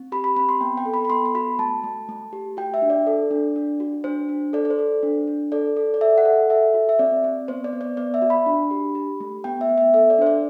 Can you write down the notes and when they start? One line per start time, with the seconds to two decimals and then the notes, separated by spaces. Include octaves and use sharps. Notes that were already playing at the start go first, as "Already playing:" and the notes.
Already playing: C4
0.12 G4 B5
0.24 B5
0.36 C4 B5
0.49 C6
0.61 B3 G5
0.78 G5
0.86 A4
0.94 B5
1.05 B5
1.10 B3 C6
1.25 C6
1.35 F#4 B5
1.59 A3 A5
1.84 A3
2.09 A3
2.33 G4
2.57 F#4 G5
2.74 E5
2.82 D4
2.90 D5
3.07 A4
3.31 D4
3.56 D4
3.80 F#4
4.04 D4 C5
4.29 D4
4.53 A4 D5
4.65 D5
4.70 C5
4.79 A4
5.03 D4
5.28 D4
5.52 A4 D5
5.77 A4
5.94 D5
6.01 A4 E5
6.18 F#5
6.25 A4
6.50 A4 E5
6.74 F#4
6.89 E5
6.99 C4 D5
7.24 C4
7.48 B3 C5
7.64 D5
7.73 B3
7.81 D5
7.97 B3 D5
8.14 E5
8.22 F#4
8.30 B5
8.46 D4
8.71 G4
8.95 G4
9.20 A3
9.44 B3 G5
9.61 E5
9.69 B3
9.78 E5
9.94 A4 E5
10.10 D5
10.19 D4 C5
10.27 D5